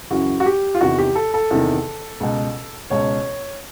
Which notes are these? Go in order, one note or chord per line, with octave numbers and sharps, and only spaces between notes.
F#2 C#3 E3 F#4
F#4
G4
F4
E2 C3 D#3 F#4
G4
A4
A4
E2 C3 D#3
C#2 B2
C#2 B2 C#5